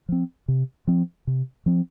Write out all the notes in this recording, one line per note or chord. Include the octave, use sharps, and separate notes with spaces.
F3 C4
C3
F3 C4
C3
F3 C4